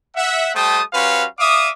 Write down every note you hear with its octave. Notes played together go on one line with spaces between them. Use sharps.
E5 F#5
G3 A3 C5 G5 A5 D#6
G3 C#4 F#4 B4 C5 F5
D5 E5 F5 D6 D#6